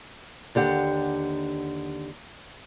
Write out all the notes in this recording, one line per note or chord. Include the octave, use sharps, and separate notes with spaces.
D#2 D3 G4 F#5